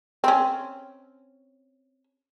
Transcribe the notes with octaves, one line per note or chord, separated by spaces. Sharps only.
C4 C#4